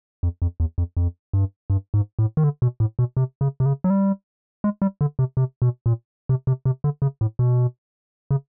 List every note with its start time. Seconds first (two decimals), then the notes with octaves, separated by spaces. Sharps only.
0.23 F2
0.42 F2
0.60 E2
0.78 F2
0.97 F2
1.33 G2
1.70 G2
1.94 G#2
2.19 A2
2.37 D#3
2.43 D3
2.62 B2
2.80 A2
2.99 B2
3.17 C3
3.41 C#3
3.60 C3
3.66 C#3
3.84 F#3
3.90 G3
4.64 G#3
4.82 G3
5.01 D3
5.19 C3
5.37 C3
5.62 B2
5.86 A#2
6.29 C3
6.47 C3
6.65 C3
6.84 D3
7.02 C#3
7.21 A2
7.39 B2
8.31 C#3